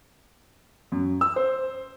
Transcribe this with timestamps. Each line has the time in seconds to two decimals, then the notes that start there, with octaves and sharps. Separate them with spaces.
0.92 F#2
1.21 E6
1.36 C5